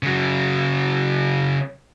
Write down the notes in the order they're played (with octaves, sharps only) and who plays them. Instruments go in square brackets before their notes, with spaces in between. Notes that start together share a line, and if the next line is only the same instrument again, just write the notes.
[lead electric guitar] C#3 F#3